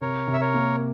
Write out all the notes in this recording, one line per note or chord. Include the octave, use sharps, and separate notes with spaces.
C3 A#4 C#5
C3
E5
A#4 C#5
A#3